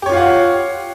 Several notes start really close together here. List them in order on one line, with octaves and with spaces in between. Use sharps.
G4 C#5 F4 F5 F#5